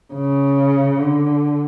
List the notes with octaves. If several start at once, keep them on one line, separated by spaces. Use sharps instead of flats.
C#3
D3